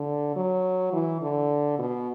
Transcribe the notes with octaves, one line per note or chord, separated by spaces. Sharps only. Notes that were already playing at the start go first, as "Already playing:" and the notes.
Already playing: D3
F#3
E3
D3
B2